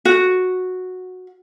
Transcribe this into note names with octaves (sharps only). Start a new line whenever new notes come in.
F#4